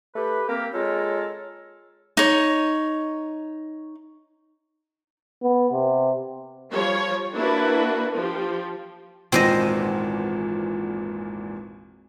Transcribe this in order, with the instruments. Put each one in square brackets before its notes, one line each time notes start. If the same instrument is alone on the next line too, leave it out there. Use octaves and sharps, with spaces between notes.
[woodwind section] A3 G4 B4
A#3 C4 G4 A#4
G#3 F4 A4 A#4 C#5
[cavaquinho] D#4 C#5
[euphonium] B3
C3
[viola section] F3 G3 C#5
A#3 D4 E4 F#4 B4
F3 G4
[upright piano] G#1 E2 A#2 [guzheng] C4 C5 D#5